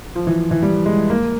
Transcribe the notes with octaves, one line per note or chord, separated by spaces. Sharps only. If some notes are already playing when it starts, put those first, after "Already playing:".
F3
E3
E3
G3
G#3
A#3